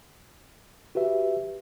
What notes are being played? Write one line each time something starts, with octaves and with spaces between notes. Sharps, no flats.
F#4 G4 B4 E5